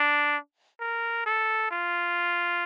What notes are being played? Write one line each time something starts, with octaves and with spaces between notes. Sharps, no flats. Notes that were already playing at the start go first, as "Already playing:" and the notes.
Already playing: D4
A#4
A4
F4